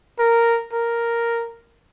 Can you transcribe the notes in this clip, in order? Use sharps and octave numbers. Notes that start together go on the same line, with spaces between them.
A#4
A#4